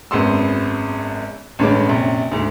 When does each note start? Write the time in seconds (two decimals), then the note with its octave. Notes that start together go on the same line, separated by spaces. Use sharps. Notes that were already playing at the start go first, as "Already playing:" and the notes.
0.11 G#1 F#2 G#3 B3 C6 E6
1.59 A1 G2 D3 G#3 C#4 D6
1.86 A#1 F#2 C3
2.31 D2 G#2 A3